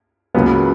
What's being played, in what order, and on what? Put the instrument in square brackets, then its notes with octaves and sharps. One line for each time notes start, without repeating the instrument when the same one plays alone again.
[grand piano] C#2 C#3 F#3 B3 [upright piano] A#3